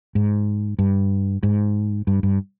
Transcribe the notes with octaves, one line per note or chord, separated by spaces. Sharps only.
G#2
G2
G#2
G2
G2